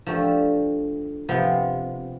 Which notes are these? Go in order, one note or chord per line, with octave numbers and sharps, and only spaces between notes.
F3 A3 D4 G4
C3 F3 B3